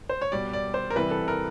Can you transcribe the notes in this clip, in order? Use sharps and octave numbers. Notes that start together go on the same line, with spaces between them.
C5
C#5
B2 G3 D5
D5
C5
A#4
C3 E3 G3 B4
A4
A#4